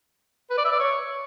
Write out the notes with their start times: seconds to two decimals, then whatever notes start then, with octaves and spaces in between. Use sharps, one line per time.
0.50 B4
0.58 D5
0.65 E5
0.72 D5
0.79 C#5